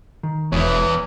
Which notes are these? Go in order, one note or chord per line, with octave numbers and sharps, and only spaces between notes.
D#3
E1 E2 B3 C#5